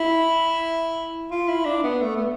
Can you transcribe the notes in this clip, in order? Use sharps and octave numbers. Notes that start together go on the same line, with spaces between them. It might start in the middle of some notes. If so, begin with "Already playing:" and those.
Already playing: E4
F4
E4
D4
B3
A3
B3